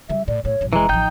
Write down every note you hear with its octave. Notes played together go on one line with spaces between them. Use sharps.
C#3 G3 E5
A2 D5
A2 C#5
A#1 G2
F1 E3 G#3 A#5
A1 F3 D#4 G5 G6